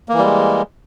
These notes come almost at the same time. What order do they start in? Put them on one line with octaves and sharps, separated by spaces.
A#3 E3 G3 G#3